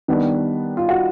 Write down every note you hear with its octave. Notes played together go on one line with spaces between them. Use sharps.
D#3 G3 B3 D4
F4
F#4